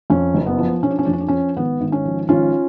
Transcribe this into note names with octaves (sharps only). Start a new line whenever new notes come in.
F2 C#4
F#1
B3
F3
F3 C#4
D4
C#4
F2 D4
C#4
D4
F3 C#4
G#1 B3
G#1
C#4
F3
G#1 C#4 F4